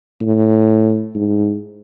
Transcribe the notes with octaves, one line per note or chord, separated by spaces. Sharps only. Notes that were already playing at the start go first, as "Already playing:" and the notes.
A2
G#2